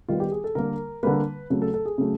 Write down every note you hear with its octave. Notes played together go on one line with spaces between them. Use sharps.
D#3 G3 B3 F4
G4
G#4
A4
D3 G3 A#3 A#4
D3 G3 A#3 B4
C#3 F#3 A3
A4
A4
G#4
C#3 F#3 A3